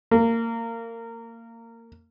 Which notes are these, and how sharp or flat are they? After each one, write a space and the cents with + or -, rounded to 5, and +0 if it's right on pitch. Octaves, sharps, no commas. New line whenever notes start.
A#3 -25